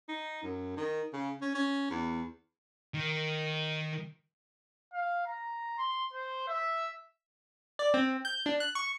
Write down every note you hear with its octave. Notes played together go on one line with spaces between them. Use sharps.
D#4
F#2
D#3
C#3
C#4
C#4
E2
D#3
F5
A#5
C6
C5
E5
D5
C4
G6
D4
F#6
C#6